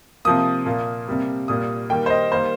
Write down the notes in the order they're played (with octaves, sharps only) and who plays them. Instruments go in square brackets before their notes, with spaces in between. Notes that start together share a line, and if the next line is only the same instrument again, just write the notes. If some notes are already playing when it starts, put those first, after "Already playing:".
[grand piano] C3 F3 A#3 D#6
A#2 A#3
C3 G3 A#3
A#2 G3 A#3 D#6
D#3 G3 A#3 G5
C5
D#5
D#3 G3 A#3 C5